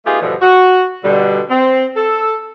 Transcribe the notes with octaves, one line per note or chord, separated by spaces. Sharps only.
A3 B3 D#4 F4 G4 G#4
E2 G2 B2 D3 E3 F3
F#4
B2 D3 G3
C4
A4